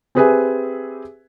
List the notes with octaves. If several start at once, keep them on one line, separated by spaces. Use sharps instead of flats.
C4 G4 G#4 B4 E5 G#5